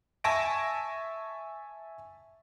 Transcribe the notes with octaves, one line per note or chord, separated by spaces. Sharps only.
E5 G#5 A5 C#6 A#6 D7